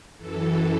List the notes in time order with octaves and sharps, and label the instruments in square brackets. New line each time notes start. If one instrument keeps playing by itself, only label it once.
[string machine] F#2 E3 A4